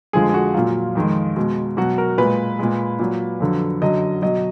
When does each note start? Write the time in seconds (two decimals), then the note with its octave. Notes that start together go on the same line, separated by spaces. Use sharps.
0.13 F2 D3 F3 G#3 G#4
0.29 G#4
0.34 F#4
0.54 A#2 F#3 F4
0.95 F2 D#3 G#3
1.36 B2 G#3
1.77 B2 F#3 F#4
1.98 A#4
2.18 A#2 G#3 B4
2.59 A#2 G#3
2.99 A#2 F#3
3.40 F2 D3 F#3
3.82 F#2 D3 F#3 D#5
4.22 B2 F#3 D#5